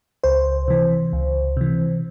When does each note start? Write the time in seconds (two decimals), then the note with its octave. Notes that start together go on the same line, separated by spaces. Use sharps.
0.24 C#2 C5
0.68 C3 E3
1.13 C#2
1.57 C3 E3